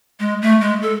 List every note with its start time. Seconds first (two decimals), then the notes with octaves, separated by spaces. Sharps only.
0.20 G#3
0.42 A3
0.61 G#3
0.82 A4